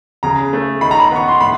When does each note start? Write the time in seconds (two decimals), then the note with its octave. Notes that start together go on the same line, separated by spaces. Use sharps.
0.23 C#3 A#5
0.53 A3
0.81 D#3 B5
0.91 A#5
1.00 B5
1.11 B3 C#6
1.28 C6
1.40 A2 B5